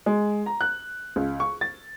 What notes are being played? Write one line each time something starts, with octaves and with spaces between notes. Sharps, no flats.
G#3
A#5
F#6
C#2
C#6
A6